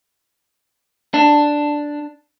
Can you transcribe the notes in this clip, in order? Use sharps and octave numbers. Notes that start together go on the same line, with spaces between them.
D4